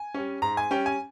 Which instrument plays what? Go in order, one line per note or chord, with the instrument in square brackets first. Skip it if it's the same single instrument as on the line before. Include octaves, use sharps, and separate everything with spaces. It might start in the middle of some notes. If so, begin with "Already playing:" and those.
Already playing: [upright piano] G#5
G3 C#4
G#2 A#5
G#5
G3 C#4 G5
G#5